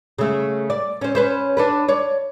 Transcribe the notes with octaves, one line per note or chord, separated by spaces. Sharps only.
C#3 A3
D5
C4 C#4
C#4 B4 C5
D4 A4 B4
C#5 D5